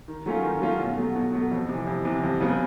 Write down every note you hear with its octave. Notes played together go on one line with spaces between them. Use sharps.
D#3
F#3 A3 C#4 F4
D#3
F#3 A3 C#4 F4
B2
F#3 A3
B2
F#3 A3
F2
C3
E3
F2
C3 E3
F2
C#3 F#3 B3